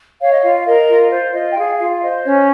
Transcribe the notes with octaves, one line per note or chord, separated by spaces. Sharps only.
C#5 F5
D#5
F4 F5
A#4 D#5
F4
C5
F4 D#5
G5
G#4 F5
F4 F5
C5 D#5
C#4 C#5